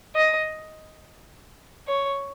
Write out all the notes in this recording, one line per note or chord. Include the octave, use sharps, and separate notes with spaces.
D#5
C#5